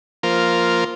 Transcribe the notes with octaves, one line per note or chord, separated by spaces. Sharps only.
F3 A#3 F4 A#4 C5